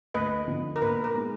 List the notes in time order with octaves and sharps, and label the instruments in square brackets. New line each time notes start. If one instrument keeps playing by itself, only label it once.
[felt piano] D2 [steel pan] B4 D#5
[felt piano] D3 F3 B3 D4
[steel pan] A#4
[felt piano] A#2 [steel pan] B4
[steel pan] A#4
[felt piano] G#3 B3 D#4 G#4